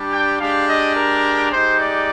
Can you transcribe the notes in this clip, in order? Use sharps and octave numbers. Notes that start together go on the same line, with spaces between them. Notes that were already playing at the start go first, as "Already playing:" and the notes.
Already playing: G3 D4 G4
G5
G#3 D4 G4 F5
D#5
A#4
G#3 D#4 G4 C5
D5